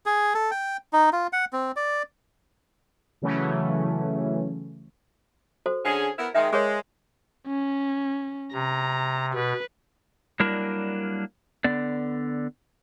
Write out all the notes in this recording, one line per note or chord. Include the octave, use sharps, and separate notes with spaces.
G#4
A4
G5
D#4
F4
F#5
C4
D5
C#3 E3 F#3 A3 C#4
F#4 A4 C5
D3 C#4 G#4
B3 E4 A#4
D#3 G#3 E5 G5
G#3 G#4 A#4 C#5
C#4
C3 A#5
B2 B4
F#3 G3 A#3 D4 E4 A#4
D3 B3 D5